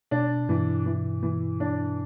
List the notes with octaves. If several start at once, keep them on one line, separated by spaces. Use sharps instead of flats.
B2 D4
G2 E3
E3
E3
D4